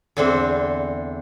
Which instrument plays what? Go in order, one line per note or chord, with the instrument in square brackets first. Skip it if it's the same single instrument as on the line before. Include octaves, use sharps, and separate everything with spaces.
[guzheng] E2 D3 C4